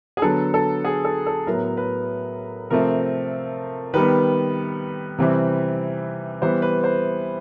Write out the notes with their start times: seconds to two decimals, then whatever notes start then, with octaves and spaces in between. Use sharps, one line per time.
0.17 G#4
0.22 D3 F#3 B3 A4
0.54 A4
0.85 G#4
1.05 A4
1.26 A4
1.47 A2 F#3 B3 A#4
1.77 B4
2.70 C3 F3 A3 C4 A#4
3.94 D#3 G3 B3 B4
5.19 C3 E3 G3 C4
6.42 E3 G3 B3 C5
6.62 B4
6.84 C5